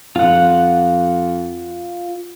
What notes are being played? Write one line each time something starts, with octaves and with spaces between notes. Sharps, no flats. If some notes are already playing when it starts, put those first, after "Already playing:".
F2 F4 F#5